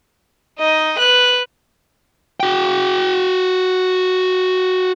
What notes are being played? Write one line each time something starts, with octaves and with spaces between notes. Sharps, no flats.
D#4 D#5
B4 F#6
F#4 G5